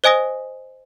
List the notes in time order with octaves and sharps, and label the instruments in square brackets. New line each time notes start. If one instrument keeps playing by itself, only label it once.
[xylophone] C5 D#5 G#5 D#6 A#6